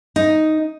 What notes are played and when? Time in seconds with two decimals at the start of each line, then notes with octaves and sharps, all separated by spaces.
0.16 D#4